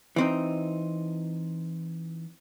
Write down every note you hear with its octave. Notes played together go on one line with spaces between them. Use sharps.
E3 C4 D#4